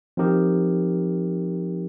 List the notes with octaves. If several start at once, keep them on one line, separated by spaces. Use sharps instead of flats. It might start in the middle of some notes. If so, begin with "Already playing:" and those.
F3 C4 D#4 G4 A#4